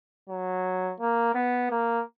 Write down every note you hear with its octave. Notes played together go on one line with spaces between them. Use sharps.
F#3
A#3
B3
A#3